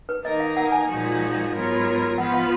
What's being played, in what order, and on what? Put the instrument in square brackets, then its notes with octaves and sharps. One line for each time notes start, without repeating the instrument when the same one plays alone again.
[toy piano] B4
[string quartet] D#3 A#3 D#4 A#4 [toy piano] D#5
[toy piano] F5
F#5
G#5
[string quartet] A#2 F3 G#3 D#4 F#4
G#2 F#3 B3 F4 A#4
[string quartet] F3 B3 F4 B4 [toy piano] F#5
[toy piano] F5